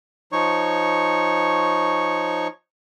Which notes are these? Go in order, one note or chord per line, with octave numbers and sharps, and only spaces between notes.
F3 D#4 C#5 C#6